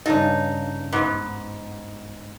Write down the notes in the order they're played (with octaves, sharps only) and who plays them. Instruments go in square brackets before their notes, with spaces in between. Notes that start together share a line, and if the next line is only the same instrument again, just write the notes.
[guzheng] G2 C#3 A4 [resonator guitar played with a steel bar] D#4
[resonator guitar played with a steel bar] G#2 [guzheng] B3 B4